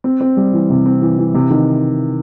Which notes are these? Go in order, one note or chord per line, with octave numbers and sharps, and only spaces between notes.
C4
C4
G3
E3
C3
C4
E3
E3
C3
D#3